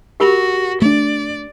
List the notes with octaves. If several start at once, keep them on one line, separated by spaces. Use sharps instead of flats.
F#4 G4 A#4 B5
A3 D4 D5